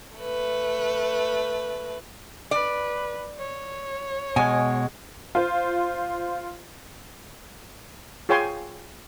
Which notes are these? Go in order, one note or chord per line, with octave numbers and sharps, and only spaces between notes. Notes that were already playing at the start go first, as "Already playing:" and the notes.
A3 B4
B4 D5
C#5
B2 G#3 G#5
F4 C5
F4 G#4 C#5 G5 G#5 C6